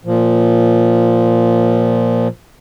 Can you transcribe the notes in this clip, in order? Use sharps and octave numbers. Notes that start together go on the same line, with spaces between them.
A#2 F3